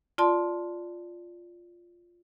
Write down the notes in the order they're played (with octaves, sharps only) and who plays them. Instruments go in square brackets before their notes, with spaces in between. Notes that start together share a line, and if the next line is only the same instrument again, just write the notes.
[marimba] F4 D5 A5 C6